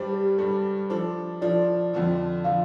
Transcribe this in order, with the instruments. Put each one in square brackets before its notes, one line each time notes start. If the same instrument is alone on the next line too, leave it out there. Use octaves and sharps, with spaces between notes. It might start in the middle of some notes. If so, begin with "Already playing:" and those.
Already playing: [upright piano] G2 G3 D4 [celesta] C5
[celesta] G4
[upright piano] G2 G3 D4 [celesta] A4
[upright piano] F3 D4 A4 [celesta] C5
[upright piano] F3 D4 A4 [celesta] D5
[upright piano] F2 D3 F3
[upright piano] D3 F3 [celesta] F5